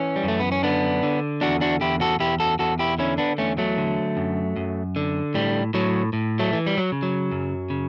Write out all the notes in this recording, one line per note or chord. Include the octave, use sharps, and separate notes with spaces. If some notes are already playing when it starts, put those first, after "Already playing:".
Already playing: E3 C#4
G3
F#2 A3
B3
C#4
D3 B3 D4
D3
E2 D4 F#4
D4 F#4
E2 E4 G4
F#4 A4
E2 E4 G4
F#4 A4
E2 F#4 A4
E4 G4
D3 C#4 E4
B3 D4
E2 A3 C#4
F#3 A3
D3
F#2
F#2
D3
A2 G3
A2 F#3
A2
F#3 A3
E3
G3
F#3
C#3
F#3
F#2
C#3